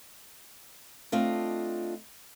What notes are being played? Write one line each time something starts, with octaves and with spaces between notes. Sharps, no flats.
A3 C4 D4 F4 D#5